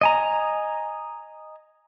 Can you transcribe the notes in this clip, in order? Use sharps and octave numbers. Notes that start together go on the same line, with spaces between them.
D#5 G#5 A#5